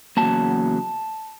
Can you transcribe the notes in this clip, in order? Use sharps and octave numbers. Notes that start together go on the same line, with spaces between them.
E2 C#3 F#3 A#3 A5